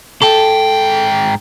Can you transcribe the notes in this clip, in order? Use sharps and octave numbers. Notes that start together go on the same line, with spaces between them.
G#2 A4 G5